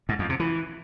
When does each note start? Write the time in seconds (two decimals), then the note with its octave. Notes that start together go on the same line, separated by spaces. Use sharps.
0.09 G#2
0.19 F2
0.29 C3
0.40 E3